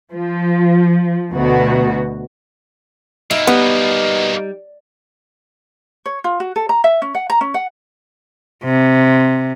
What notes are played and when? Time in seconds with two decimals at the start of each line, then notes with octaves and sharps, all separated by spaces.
0.11 F3
1.32 D2 B2 F#4
3.31 B2 A#3 D#4 E5
3.47 G3 B3
6.06 C#5
6.24 F4
6.40 F#4
6.56 A4
6.69 A#5
6.84 E5
7.02 C#4
7.15 F#5
7.30 A#5
7.41 C#4
7.54 F#5
8.65 C3